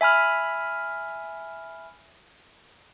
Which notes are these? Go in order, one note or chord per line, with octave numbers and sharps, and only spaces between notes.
E5 G#5 B5 F6